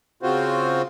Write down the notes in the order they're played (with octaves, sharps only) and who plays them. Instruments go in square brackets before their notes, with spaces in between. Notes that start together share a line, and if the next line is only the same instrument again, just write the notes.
[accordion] C#3 C4 F4 F#4 C5